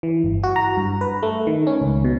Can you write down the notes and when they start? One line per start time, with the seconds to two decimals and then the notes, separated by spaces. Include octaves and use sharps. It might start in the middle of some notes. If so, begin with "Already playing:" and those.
0.03 E3
0.24 G1
0.43 F#4
0.56 A#5
0.77 G2
1.01 B4
1.23 A3
1.47 D#3
1.67 C#4
1.82 C#2
2.05 B2